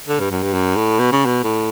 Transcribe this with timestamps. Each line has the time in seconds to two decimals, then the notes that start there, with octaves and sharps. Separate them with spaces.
0.09 D3
0.20 G2
0.31 F#2
0.43 G2
0.54 F#2
0.76 A2
0.99 B2
1.12 C#3
1.26 B2
1.44 A2